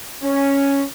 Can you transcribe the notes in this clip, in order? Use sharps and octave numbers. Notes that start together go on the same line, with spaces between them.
C#4